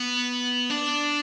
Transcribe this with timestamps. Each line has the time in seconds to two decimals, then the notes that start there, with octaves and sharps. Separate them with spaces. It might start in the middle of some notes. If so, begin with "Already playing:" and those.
Already playing: B3
0.70 D4